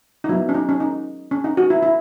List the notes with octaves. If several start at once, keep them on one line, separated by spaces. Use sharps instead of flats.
D#4
F#3 B3 E4
C#4
D#4
C#4
D#4
C#4
D#4
F#4
E4
E4